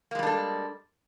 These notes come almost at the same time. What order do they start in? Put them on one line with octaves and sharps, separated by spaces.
A#3 G#3 G3 D4 A4